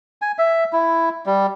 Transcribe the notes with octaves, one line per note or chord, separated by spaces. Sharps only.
G#5
E5
E4
G3